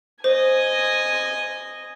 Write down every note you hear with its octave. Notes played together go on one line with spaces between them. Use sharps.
C5 D#5 G#5